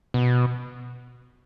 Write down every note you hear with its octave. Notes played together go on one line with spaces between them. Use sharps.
B2